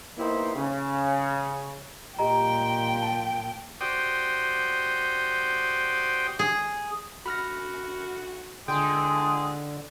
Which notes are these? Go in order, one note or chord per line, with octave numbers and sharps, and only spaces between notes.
A#3 B3 D#4 E4 G4 C5
C#3
A#2 G4 D#5 G5 A#5
A5
F#4 G4 C5 D5 G5 D#6
G#4
F#4 B5 F6 A#6
D3 G#3 G#4 G5